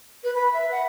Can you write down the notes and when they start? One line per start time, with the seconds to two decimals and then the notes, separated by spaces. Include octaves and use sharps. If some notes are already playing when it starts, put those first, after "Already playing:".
0.24 B4
0.35 B5
0.54 E5
0.71 F#5